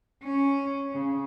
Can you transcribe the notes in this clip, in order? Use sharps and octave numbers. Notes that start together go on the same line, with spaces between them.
C#4
C#3